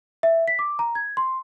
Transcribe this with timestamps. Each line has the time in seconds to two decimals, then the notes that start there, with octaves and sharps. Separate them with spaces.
0.23 E5
0.48 B6
0.59 D6
0.79 A#5
0.95 G#6
1.17 C6